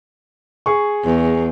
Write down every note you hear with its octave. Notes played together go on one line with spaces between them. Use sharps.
G#4 C#6
E2